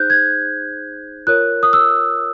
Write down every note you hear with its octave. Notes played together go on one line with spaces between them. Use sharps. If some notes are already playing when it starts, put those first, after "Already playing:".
Already playing: D#4 G#4 C5 F#6 G6
G#6
F4 A#4 C#5 F#6
D#6
E6